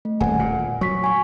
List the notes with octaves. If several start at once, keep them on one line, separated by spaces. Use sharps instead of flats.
A3
D#1 F#5 G#5
A#2
F#3 C#6 B6
G#5 C#6